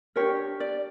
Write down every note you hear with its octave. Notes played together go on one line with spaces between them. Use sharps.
D4 G4 A#4 C#5
D5